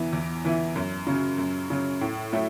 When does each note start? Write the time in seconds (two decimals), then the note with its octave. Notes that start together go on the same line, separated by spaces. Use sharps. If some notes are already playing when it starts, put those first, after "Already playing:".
Already playing: E2 E3 B3 E4
0.13 E2
0.44 E3 B3 E4
0.76 F#2
1.07 C#3 F#3
1.38 F#2
1.70 C#3 F#3
2.01 A2
2.32 F#3 A3 E4